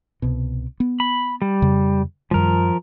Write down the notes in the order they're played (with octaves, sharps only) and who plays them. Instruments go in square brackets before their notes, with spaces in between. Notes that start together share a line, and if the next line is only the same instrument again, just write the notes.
[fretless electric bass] C2 B2
B3
[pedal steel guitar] B5
G3
[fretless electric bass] F2 C#3
[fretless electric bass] F#2 D#3 G3 [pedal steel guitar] F3 A#4